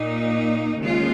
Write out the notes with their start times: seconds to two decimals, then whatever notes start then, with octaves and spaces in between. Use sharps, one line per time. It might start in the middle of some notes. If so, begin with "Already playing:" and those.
Already playing: A#2 A#3 D#4
0.79 D#2 C#3 G#3 F4